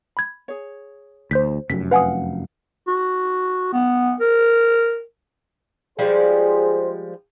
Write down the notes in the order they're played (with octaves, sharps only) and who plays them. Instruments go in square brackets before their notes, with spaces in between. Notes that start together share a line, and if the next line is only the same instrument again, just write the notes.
[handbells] B5 G#6
[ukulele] G#4 C#5
[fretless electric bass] D2 [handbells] C5 G6 B6
[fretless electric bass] F1 F#2 [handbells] B6
[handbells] B4 G#5 D#6 [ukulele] F5 F#5
[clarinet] F#4
B3
A#4
[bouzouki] F3 G3 G#3 [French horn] G#4 [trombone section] C5